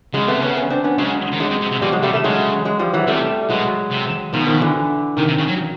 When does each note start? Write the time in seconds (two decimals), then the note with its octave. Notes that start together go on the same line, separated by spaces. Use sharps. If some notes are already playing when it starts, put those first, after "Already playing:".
0.14 C#3 F#3 G#3
0.27 C3 A3 B3
0.40 C#3 B3 C#4
0.57 B3 C#4
0.70 C4 D4
0.84 B3 C#4
0.98 C#3 F#3 G#3
1.33 D#3
1.40 D3 F#3 G#3
1.50 C3
1.61 C3
1.71 C3
1.82 B2 F3 G3
1.92 F#3 G#3
2.02 C3 G3 A3
2.13 G3 A3
2.24 C#3 F#3 G#3
2.65 F#3 G#3
2.79 F3 G3
2.93 E3 F#3
3.07 C3 G3 A3
3.50 B2 F#3 G#3
3.91 C3
4.33 B2 D#3 F3
4.47 D#3 F3
4.62 D3 E3
5.17 C3 D#3
5.28 C3
5.38 C#3
5.48 F#3